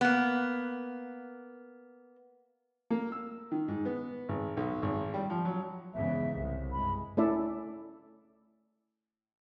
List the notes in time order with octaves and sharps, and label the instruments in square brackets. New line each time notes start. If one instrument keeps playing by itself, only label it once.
[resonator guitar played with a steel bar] A#3 B3
[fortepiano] A#3
E6
D#3
G#2
B3
G#1
B1
G#1
G3
F3
F#3
[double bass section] E2 G#2 C#3 [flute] E5
[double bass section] C2
[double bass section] G2 G#3 [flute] B5
[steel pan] A3 C#4 E4 A4 D5 E5